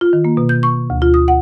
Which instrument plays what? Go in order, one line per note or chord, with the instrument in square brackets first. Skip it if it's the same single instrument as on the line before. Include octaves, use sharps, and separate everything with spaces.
[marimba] F4
D#3
A#3
B2
G6
C#6
D2
F4
D#6
F#5